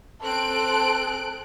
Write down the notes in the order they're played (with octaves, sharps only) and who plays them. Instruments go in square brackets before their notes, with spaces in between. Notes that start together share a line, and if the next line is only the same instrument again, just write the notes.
[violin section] C4 F#6 D7 [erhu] A4